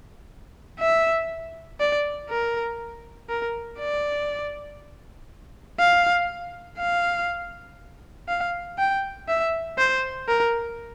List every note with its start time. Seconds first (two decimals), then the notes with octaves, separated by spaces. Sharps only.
0.80 E5
1.80 D5
2.30 A#4
3.30 A#4
3.79 D5
5.79 F5
6.78 F5
8.29 F5
8.79 G5
9.28 E5
9.78 C5
10.28 A#4